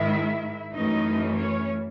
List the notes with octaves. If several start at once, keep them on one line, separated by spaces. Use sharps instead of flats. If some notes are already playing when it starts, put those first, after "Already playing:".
Already playing: G#2 D#3 G#3 E4 E5
F#2 E3 A3 C#4 D#4 D#5
C#4 C#5